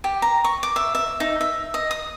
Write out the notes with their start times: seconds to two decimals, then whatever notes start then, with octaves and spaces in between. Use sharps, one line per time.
0.04 G4
0.22 A#5
0.44 C#6
0.63 D6
0.76 E5
0.95 E5
1.20 D#4
1.41 E5
1.74 D#5
1.91 D#6